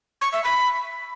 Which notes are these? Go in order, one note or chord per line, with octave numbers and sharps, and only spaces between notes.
C#6
E5
B5